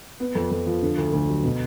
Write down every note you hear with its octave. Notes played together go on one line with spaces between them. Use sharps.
B3
F2
F2
F3
D3
D2
D2
F#3
B2